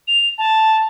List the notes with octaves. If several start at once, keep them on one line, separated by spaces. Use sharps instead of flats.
F7
A5